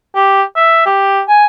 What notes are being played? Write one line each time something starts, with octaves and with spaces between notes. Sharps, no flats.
G4
E5
G4
G#5